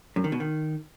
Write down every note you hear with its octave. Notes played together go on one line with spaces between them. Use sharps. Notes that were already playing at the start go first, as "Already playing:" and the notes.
F#2
D#3
B2
D#3